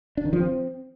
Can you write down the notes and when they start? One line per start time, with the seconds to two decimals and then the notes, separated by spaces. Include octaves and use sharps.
0.17 D4
0.25 D#3
0.33 F3
0.40 C4